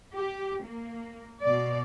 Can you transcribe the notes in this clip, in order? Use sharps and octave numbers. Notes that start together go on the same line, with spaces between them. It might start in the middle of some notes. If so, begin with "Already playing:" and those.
G4
A#3
B2 D5